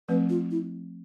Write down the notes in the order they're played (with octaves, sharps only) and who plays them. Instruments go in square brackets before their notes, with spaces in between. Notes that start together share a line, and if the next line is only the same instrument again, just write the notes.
[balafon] F3 A3 C4 [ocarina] B4
[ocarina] F4
E4